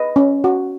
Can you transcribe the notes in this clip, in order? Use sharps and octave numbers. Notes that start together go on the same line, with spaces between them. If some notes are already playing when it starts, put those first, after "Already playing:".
Already playing: B4 D#5
C#4
F#4